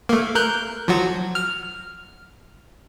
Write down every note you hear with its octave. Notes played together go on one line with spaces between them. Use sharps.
A3 A#3
A#4 F#6 G6
F3 F#3 F#4
F6